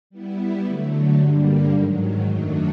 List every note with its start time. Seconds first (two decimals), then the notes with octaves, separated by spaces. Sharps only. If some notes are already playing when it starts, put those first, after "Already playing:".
0.10 G3 B3 E4
0.65 D3 F#3 A3
1.19 G2 D3 G3 A#3
1.73 G#2 D#3 F#3
2.28 F#2 D#3 F#3 A3 D4